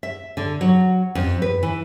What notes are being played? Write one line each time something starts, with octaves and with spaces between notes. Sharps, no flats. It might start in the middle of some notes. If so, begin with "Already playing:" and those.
E5
D3
F#3
F2
B4
E3